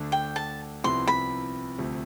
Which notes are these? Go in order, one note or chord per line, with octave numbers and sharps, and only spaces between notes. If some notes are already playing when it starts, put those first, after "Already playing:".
Already playing: D2 D3 A3 D4
G5
A5
C2 C3 F3 B3 E4 C6
B5
D2 C3 F3 A3